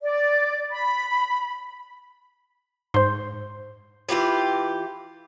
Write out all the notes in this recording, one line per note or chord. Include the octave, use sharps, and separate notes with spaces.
D5
B5
G#2 C5 C6
E3 F4 G4 B4